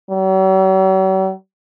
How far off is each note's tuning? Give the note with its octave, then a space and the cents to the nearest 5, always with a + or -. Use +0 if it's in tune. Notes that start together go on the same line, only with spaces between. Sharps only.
F#3 +45